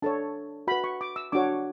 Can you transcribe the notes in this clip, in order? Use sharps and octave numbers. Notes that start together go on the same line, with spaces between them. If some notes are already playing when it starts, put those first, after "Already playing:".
D4 A4 C#5 A5
F#4 B4 B5
C#6
D6
E6
D4 F#4 C#5 D6